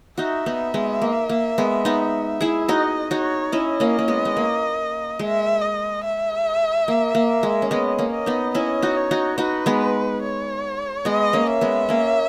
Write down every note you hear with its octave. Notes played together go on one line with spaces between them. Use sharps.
D#4 F#4 E5
B3 D#4
G#3 B3
A#3
A#3
G#3 B3
B3 D#4
E4 G#4
D#4 F#4 D#5
D#4 F#4 C#5
C#4 E4 D#5
A#3 C#4
A#3
G#3 B3
G#3
A#3
G#3 E5
D#5
E5
A#3
A#3
G#3
C#4
G#3 B3 D#5
A#3 C#4
D#5
B3 D#4
C#4 E4 D#5
D#4 F#4
C#5
D#4 F#4
D#4 F#4 B4
G#3 B3
C#5
G#3 B3 D#5
A#3 C#4
E5
G#3 B3
A#3 C#4